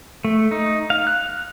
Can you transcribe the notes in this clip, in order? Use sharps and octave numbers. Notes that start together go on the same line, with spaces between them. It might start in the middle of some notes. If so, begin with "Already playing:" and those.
A3
D#4
F5
F#6